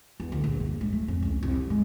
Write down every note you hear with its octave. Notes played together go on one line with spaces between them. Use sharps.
E2
D2
A#1
G2
G#3
A3
F2
C#2
C2
F3
G#3